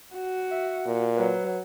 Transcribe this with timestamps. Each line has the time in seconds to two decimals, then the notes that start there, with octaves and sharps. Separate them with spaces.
0.15 F#4
0.51 E5
0.86 A#2
1.17 F#3 B4